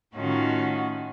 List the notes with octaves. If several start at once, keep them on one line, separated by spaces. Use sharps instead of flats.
A2 D#3 C#4 D#4 F4 F#4